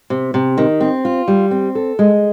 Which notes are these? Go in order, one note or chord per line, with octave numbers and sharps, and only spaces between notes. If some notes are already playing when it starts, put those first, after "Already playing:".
C3
C3
D#3
C4
F4
G3
C4
A4
G#3